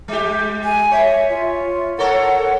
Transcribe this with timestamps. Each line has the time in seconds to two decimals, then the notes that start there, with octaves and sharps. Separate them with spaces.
0.08 G#3 G4
0.64 G#5
0.92 C#5 E5
1.30 F4
1.99 A4 A#4 C#5 F#5